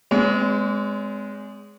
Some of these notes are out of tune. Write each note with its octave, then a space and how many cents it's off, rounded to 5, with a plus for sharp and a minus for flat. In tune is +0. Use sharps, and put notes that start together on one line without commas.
G#3 +0 C4 -35 C#5 +45